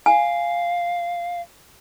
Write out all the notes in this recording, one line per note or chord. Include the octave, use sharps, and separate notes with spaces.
F5 G#5